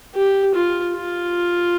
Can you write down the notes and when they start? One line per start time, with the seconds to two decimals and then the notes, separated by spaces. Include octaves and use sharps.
0.15 G4
0.55 F4
0.95 F4